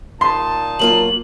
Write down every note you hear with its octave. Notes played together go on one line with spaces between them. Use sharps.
A#2 D#4 A5 C6
F#3 A#3 F4 F#7